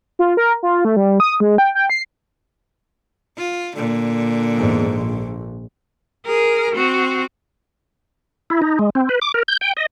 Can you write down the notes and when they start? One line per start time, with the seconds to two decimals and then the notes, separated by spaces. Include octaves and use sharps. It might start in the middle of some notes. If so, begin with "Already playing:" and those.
0.19 F4
0.37 A#4
0.63 F4
0.85 A3
0.96 G3
1.20 D#6
1.40 G#3
1.58 G5
1.75 G5
1.90 C7
3.38 F4
3.76 A#2 D3
4.56 E2 G#2
4.93 A#1
6.25 G#4 A#4
6.75 C4 F#4
8.50 E4
8.62 D#4
8.79 G#3
8.95 C4
9.09 B4
9.22 D6
9.34 A#4
9.48 G6
9.61 G5
9.77 D#5